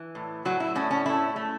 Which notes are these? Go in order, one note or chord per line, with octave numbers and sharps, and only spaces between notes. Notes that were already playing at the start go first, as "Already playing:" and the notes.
Already playing: E3
A2
A2 F#3 F#4
E4
A2 C#4
C#4
A3 E4
A3